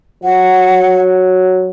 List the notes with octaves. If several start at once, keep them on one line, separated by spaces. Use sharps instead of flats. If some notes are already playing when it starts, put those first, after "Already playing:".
F#3 F#5